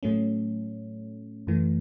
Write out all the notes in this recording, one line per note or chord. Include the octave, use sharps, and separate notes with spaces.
A2 F#3 A3 C#4
F#2 E3 A3